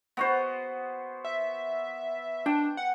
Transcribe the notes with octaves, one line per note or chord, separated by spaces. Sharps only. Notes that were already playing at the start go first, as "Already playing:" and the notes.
B3 F#4 C5
E5
D4 G5
F#5